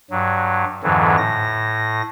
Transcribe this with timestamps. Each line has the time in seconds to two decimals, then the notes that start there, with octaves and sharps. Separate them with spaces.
0.10 G2 F#3
0.83 F2 G#2 D3 E3 F#3
1.17 A2 A#6